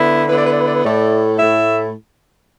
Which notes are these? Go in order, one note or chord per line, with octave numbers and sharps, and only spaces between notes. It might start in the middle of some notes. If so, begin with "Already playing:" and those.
Already playing: D3 B3 E4
D3 B3 E4 B4
D5
B4
D5
B4
D5
B4
A2 A3 E4 D5
A2 A3 E4 E5